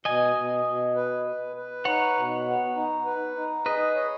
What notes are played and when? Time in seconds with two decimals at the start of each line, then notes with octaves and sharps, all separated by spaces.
0.05 B2 D#5 G#5
0.36 B2
0.66 B2
0.96 B4
1.26 B4
1.56 B4
1.85 D#4 C#5 F#5
2.16 B2
2.46 B3
2.75 D#4
3.05 B4
3.35 D#4
3.66 G#4 B4 D#5
3.95 C#5